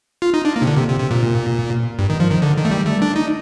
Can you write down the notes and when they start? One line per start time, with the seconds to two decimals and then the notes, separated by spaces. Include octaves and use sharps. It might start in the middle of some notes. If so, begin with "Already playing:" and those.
0.22 F4
0.34 D#4
0.45 D4
0.56 A#3
0.62 C3
0.67 D3
0.77 C3
0.88 C3
1.00 C3
1.11 A#2
1.99 G2
2.10 D#3
2.20 F3
2.31 D#3
2.42 D3
2.57 D#3
2.65 A3
2.71 G3
2.86 A3
3.02 D4
3.16 D#4